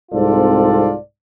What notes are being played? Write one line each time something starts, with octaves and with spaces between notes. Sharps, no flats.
C2 G#2 C4 F4 A4 D5